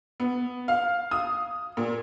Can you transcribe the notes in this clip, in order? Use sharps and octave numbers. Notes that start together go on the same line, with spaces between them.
B3
F5
D#6
A#2